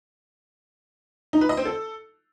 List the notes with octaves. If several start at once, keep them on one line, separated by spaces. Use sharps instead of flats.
D#4
B4
D#5
C4
A4